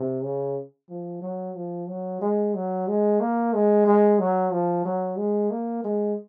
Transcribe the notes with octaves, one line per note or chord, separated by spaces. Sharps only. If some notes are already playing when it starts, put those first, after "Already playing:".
Already playing: C3
C#3
F3
F#3
F3
F#3
G#3
F#3
G#3
A#3
G#3
G#3
F#3
F3
F#3
G#3
A#3
G#3